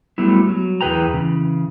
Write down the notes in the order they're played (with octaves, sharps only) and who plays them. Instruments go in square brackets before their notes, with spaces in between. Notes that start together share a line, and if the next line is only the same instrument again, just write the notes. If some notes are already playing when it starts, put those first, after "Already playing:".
[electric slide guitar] F#3 G3 A3 B3 E4
F#3
E2 E3 G#4 B4 G5 A#5
C#3 E3